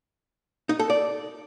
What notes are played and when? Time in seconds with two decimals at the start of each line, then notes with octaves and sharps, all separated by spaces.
0.69 D#4
0.79 A4
0.90 D5